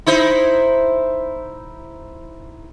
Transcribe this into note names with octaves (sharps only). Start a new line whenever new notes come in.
D#4 E4 C5